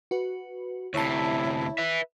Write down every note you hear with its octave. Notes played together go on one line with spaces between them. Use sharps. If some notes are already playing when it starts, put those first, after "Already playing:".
F#4 B4
D2 C3 E4 C#5 E5 A5
B4 E5